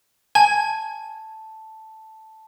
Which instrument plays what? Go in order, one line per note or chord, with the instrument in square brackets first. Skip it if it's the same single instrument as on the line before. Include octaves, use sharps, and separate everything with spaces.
[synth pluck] G#5 [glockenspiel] A5